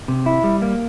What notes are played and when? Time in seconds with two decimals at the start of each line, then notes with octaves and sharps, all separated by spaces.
0.08 C3
0.26 E4
0.44 G3
0.62 A#3